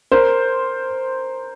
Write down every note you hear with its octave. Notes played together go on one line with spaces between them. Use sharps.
A#4 C5